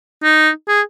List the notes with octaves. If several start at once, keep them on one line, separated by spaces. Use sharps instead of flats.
D#4
G#4